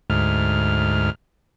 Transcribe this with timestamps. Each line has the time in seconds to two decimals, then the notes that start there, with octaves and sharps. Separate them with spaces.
0.10 D2 G#2 F6